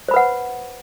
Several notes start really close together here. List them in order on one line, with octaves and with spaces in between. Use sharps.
C5 B5 B4 F#5